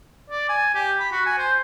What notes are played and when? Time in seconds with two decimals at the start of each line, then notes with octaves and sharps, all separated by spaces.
0.30 D5
0.49 G#5
0.75 G4
1.00 B5
1.12 F#4
1.26 G#5
1.38 C5